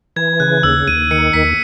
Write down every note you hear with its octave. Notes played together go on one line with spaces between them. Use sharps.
E3 G#6
C#3 F#6
D#2 E6
D#2 D#7
D#3 C#7
D#2 B6